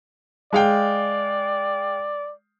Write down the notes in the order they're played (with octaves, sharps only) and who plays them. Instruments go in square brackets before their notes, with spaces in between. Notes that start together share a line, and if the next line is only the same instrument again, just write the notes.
[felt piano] G#3 F5 G5 [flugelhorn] D5